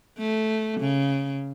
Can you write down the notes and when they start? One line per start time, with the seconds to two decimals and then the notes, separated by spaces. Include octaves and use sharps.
0.18 A3
0.81 C#3